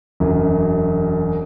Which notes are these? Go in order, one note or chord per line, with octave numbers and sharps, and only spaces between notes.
E1 F#2